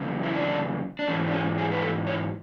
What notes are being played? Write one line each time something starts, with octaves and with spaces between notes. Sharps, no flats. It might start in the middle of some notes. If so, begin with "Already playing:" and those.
Already playing: E2 C#3 F#3
E4
D4
D4
G#2 E3 C#4
D4
C#4
G#4
B4
A4
C#5